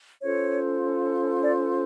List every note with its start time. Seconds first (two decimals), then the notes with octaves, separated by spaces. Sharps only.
0.23 C#4 F4 A4 C5 C#5
1.44 D5